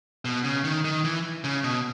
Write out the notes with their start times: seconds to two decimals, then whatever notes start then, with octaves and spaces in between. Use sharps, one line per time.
0.25 B2
0.44 C#3
0.64 D#3
0.85 D#3
1.04 E3
1.44 C#3
1.64 B2